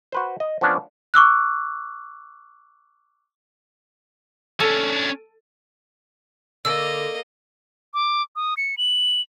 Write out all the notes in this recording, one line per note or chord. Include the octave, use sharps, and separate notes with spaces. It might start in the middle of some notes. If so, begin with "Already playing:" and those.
F#4 B4 C5
D#5
F3 B3 C#4 D4
C#6 D6 E6 F#6
C#4 D4 A4
D3 A#3 D#5 E6
D6
D#6
C#7
F#7